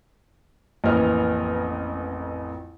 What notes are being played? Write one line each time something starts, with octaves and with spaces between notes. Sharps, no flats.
A1 F2 E3 A#3 D#5 F6